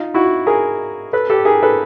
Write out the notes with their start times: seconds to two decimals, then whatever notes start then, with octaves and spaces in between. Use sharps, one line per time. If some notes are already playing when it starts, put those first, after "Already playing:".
Already playing: D#4 F4
0.14 E4 F#4
0.47 G#4 A#4
1.13 A4 B4
1.30 G4 A4
1.45 G#4 A#4
1.63 A4 B4